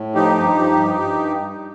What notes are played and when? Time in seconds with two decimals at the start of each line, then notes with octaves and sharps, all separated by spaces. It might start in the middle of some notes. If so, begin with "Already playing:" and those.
Already playing: A2
0.15 F3 D#4 G4
0.37 G2
0.59 F3
0.81 G2
1.02 G2